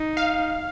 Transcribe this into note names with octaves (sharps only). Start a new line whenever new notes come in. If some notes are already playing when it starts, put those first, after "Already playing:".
Already playing: D#4
F5